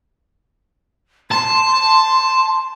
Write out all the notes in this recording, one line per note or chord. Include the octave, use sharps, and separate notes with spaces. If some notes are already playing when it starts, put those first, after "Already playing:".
A5 C6